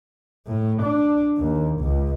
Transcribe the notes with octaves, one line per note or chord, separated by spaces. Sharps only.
A2
D4
D#2
C#2